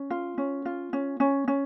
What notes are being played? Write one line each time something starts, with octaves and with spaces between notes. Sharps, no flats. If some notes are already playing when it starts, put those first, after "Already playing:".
Already playing: C#4
F4
C#4
F4
C#4
C#4
C#4